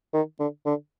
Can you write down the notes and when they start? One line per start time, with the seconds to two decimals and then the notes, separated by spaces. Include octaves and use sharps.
0.13 D#3
0.39 D3
0.66 D3